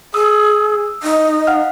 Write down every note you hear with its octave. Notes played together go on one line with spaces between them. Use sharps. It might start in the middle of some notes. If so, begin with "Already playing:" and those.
G#4 D#6 E6
D#4
F5 F#5 F6